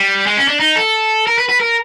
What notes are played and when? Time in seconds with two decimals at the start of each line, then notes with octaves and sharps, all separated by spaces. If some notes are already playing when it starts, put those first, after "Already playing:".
Already playing: G3
0.26 G#3
0.37 C#4
0.48 D4
0.60 D#4
0.76 A4
1.27 A#4
1.38 B4
1.49 B4
1.60 A#4